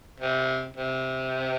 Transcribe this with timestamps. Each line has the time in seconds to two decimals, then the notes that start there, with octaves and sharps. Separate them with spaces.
0.20 C3
0.77 C3